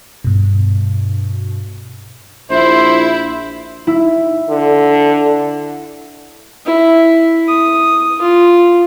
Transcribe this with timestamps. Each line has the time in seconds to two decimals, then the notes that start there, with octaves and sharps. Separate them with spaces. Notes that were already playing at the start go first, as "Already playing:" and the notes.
0.24 G2 B2
2.50 A#1 E4 C5
3.87 E4
4.50 D3
6.66 E4
7.48 D#6
8.21 F4